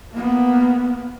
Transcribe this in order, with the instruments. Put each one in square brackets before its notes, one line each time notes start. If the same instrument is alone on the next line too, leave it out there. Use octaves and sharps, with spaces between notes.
[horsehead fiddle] A#3 B3